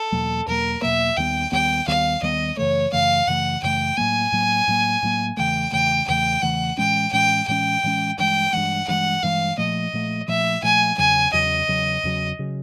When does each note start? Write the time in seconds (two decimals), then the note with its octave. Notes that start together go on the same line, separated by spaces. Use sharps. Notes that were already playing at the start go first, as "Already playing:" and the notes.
Already playing: A4
0.12 E2 B2 F#3 A#3
0.47 E2 B2 F#3 A#3 A#4
0.82 E2 B2 F#3 A#3 E5
1.17 D#2 D#3 G3 B3 G5
1.52 D#2 D#3 G3 B3 G5
1.87 D#2 D#3 G3 B3 F5
2.22 D#2 D#3 G3 B3 D#5
2.57 F#2 C#3 E3 A3 C#5
2.92 F#2 C#3 E3 A3 F5
3.27 F#2 C#3 E3 A3 F#5
3.63 F#2 C#3 E3 A3 G5
3.97 A2 F#3 A#3 G#5
4.32 A2 F#3 A#3
4.68 A2 F#3 A#3
5.03 A2 F#3 A#3
5.37 E2 C#3 E3 A3 G5
5.72 E2 C#3 E3 A3 G5
6.08 E2 C#3 E3 A3 G5
6.42 E2 C#3 E3 A3 F#5
6.77 A2 E3 G#3 C#4 G5
7.12 A2 E3 G#3 C#4 G5
7.48 A2 E3 G#3 C#4 G5
7.83 A2 E3 G#3 C#4
8.18 G2 E3 G#3 G5
8.53 G2 E3 G#3 F#5
8.88 G2 E3 G#3 F#5
9.23 G2 E3 G#3 F5
9.58 A#2 F3 A3 D#5
9.93 A#2 F3 A3
10.28 A#2 F3 A3 E5
10.63 A#2 F3 A3 G#5
10.98 E2 C#3 F#3 G#5
11.33 E2 C#3 F#3 D#5
11.68 E2 C#3 F#3
12.03 E2 C#3 F#3
12.39 C#3 F#3